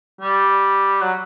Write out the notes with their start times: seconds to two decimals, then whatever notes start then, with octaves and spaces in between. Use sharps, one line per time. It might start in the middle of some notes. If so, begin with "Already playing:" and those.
0.21 G3
1.01 F#3